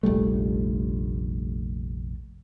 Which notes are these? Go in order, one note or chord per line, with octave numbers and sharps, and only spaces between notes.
F1 A#1 G3 A3